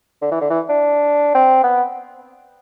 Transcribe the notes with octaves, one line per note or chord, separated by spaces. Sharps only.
D3
E3
D3
E3
D4
C4
B3